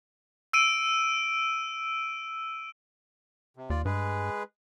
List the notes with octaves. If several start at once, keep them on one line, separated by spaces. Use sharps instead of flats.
E6 D7 D#7
C3
D#2 F4 D5
G2 G#3 G#4 B4